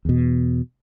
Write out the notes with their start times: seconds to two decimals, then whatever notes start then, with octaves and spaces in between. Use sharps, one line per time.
0.05 E2 B2